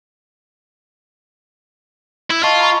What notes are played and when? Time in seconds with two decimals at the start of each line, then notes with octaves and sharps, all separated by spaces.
2.31 E4
2.43 F4 D#5 A5 C#6
2.61 A#5 B5 C#6